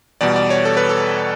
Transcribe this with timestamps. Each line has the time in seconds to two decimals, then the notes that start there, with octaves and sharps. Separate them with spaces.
0.21 E2 B2 G3 D5
0.36 D5
0.50 C#5
0.65 A4
0.77 B4
0.89 A4